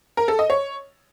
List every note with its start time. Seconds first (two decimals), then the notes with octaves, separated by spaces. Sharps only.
0.17 A#4
0.28 A4
0.39 D#5
0.50 C#5